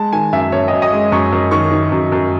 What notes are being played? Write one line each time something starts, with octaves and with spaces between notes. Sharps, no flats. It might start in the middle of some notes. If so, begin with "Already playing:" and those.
Already playing: G#3 A5
D#3 G#5
F#2 E5
F#2 C#5
F#2 D#5
D#5
G#3
F#2 C#6
F#2
D#3 C#6
D#3
F#2
F#2